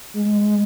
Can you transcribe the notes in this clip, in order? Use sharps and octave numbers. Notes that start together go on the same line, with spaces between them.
G#3
G#3
G#3